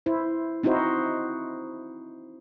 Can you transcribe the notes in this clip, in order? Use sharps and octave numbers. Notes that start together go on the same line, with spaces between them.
E4 C5
C4 D#4 E4 F#4 C5